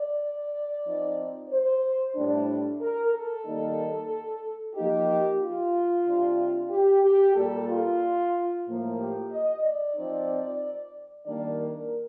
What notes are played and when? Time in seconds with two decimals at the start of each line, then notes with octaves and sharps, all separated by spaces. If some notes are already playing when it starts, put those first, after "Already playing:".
Already playing: D5
0.85 F3 C4 D#4
1.50 C5
2.15 A2 G3 D4
2.81 A#4
3.13 A4
3.46 D#3 G3 A#3 D#4
4.75 F3 A#3 D#4 G4
5.41 F4
6.06 C3 G3 D4
6.70 G4
7.03 G4
7.36 A#2 G3 A#3 A4
7.68 F4
8.66 A2 F3 A#3
8.99 G4
9.31 D#5
9.63 D5
9.96 F3 C4 D#4
11.26 D#3 G3 A#3 D4 D5
11.59 A#4